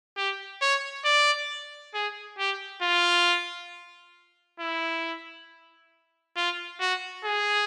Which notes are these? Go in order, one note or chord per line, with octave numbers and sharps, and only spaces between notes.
G4
C#5
D5
G#4
G4
F4
E4
F4
F#4
G#4